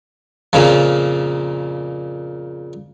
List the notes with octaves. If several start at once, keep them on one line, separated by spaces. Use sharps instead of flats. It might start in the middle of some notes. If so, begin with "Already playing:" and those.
F2 A#2 C#3 F3